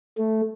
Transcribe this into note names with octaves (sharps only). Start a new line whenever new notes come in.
A3